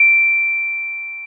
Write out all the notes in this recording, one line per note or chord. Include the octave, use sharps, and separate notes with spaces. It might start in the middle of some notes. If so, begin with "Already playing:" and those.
Already playing: D7